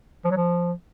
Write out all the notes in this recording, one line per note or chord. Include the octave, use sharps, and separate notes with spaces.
F3
F#3
F3